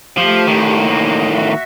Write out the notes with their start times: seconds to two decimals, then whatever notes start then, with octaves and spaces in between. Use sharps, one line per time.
0.17 F3 A3 G4
0.47 A2 D#3
0.81 A#3 D#4
1.33 F#4 E5